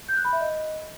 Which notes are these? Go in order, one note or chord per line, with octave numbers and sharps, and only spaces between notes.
G6
F#6
B5
E5
D#5